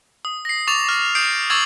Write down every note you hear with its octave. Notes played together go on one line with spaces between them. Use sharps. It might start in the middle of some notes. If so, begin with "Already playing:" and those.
D#6
A#6 C7
C#6 D6 A6 F7
F6
D#6 G6 C7 D7
C#6 D6 E6 G#6 A6 F#7